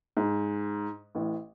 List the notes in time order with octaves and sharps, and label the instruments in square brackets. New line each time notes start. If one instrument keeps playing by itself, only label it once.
[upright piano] G#2
A1 A2